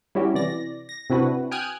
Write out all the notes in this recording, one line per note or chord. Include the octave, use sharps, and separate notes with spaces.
G3 C#4 E4 F#4 G4
C3 E3 D5 A#6
A#6
C3 C4 D4 E4 F#4 B4
G5 G#5 D#6 F6 F#6 G#6